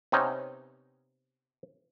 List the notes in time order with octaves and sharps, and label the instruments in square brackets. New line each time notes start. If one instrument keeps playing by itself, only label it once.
[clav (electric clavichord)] C3 B3 C#4 D#4